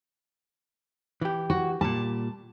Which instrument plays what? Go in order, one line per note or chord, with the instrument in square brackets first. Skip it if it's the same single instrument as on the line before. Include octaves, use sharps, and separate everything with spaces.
[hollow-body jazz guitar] E3 G4
[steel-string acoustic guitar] F#4
[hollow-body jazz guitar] A#2 G3 [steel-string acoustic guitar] A5